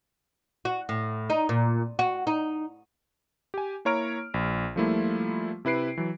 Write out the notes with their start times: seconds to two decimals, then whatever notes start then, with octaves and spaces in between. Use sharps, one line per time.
0.65 F#4
0.89 A2
1.30 D#4
1.49 A#2
1.99 F#4
2.27 D#4
3.54 G4 G#5
3.85 A#3 E4 C#5 A#5 F6 D7
4.34 A#1
4.76 F3 G3 A3 A#3 E4 F4
5.65 C3 E4 B4 C7 D7
5.97 E3 F#3